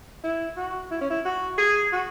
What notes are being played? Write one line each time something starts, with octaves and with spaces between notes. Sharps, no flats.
E4
F#4
E4
C#4
E4
F#4
G#4
F#4